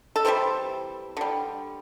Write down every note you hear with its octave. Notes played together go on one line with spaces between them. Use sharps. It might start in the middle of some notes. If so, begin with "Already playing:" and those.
A4
C3 E3 G3 C5
D3 G3